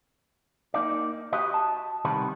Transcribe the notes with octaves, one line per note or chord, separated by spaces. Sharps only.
A#3 D#4 D5
F#4 G4 B4 D#5
A5
C3 D#3 G3 B3 B4